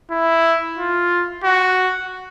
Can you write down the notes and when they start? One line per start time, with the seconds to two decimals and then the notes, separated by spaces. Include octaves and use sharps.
0.11 E4
0.78 F4
1.44 F#4